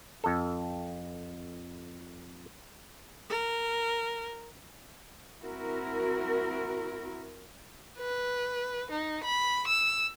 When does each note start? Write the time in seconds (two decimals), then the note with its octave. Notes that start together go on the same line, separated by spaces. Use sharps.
0.24 F2 A4
3.30 A#4
5.42 C4 E4 F#4 A#4
7.99 B4
8.91 D#4
9.24 B5
9.67 E6